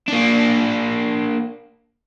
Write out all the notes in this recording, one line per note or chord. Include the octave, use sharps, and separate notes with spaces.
A#3 D4